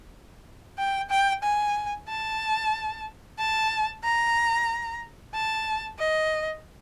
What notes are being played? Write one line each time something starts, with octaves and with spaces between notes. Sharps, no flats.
G5
G5
G#5
A5
A5
A#5
A5
D#5